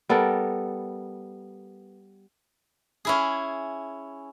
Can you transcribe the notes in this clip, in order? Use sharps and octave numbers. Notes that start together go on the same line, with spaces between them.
G3 B3 A4 A#4
C#4 E4 G#4